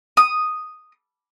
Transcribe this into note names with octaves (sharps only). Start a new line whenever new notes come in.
D#6